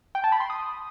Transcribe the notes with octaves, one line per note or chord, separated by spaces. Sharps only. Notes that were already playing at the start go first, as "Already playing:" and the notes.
G5
A5
B5
C6
D#6